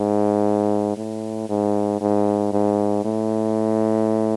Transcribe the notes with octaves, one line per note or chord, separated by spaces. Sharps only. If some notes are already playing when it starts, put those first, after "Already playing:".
Already playing: G#2
A2
G#2
G#2
G#2
A2